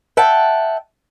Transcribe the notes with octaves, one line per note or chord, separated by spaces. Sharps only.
E5 F#5 G5 A5